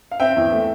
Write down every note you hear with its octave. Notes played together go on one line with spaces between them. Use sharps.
F5
C4 E5 G5
E2
A3